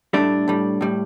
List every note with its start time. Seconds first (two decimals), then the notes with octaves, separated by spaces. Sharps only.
0.13 A2 G3 A3 D4
0.48 A2 G3
0.81 A2 G3